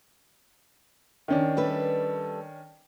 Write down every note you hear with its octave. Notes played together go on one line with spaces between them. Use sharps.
D#3 C#4 D4
G3 A4 B4